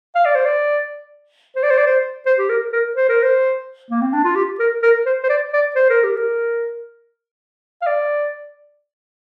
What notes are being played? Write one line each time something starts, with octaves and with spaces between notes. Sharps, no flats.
F5
D5
C5
D5
C5
D5
C5
D5
C5
C5
G4
A#4
A#4
C5
A#4
C5
A#3
C4
D4
F4
G4
A#4
A#4
C5
C5
D5
D5
C5
A#4
G4
A#4
F5
D5